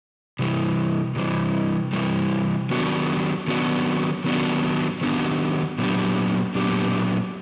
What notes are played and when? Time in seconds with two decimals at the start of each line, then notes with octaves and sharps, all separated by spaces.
0.39 C3 E3 G3
1.16 C3 E3 G3
1.93 C3 E3 G3
2.70 D#3 F#3 B3 D4 F#4
3.48 D#3 F#3 B3 D4 F#4
4.24 D#3 F#3 B3 D4 F#4
5.01 D#3 F#3 B3 D4 F#4
5.78 A#2 F#3 B3 D4 G4
6.55 A#2 F#3 B3 D4 G4